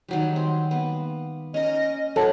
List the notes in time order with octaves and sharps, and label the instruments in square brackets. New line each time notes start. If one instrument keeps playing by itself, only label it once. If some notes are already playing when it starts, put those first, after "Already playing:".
[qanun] D#3 F#3 G3
C4
A#3 B3
[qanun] C#4 A#4 [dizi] D#5
[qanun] F#3 F#4 [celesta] A4 A5 [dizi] C#5